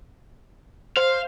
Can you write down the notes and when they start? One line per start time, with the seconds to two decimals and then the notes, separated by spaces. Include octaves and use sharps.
0.97 C5 F5